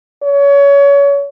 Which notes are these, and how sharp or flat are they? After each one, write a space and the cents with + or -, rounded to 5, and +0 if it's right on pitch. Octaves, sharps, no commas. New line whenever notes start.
C#5 +30